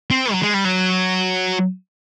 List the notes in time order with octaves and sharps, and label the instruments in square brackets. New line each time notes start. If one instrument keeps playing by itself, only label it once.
[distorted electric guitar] C4
F#3
G#3
G3
F#3